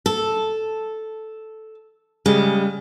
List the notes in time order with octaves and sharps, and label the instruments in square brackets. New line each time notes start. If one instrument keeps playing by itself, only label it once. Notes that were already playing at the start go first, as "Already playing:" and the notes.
[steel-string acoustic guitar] A4
[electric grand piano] C#3 G3 [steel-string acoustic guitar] G#3